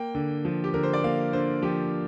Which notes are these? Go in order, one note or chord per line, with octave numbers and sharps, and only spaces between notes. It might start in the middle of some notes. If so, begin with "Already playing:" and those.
Already playing: A#3 G5
D3
F3
G4
D3 A#4
C5
D5
A#3 F5
D3 C5
F3 G4